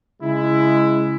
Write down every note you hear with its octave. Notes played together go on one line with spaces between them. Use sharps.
C#3 G#3 E4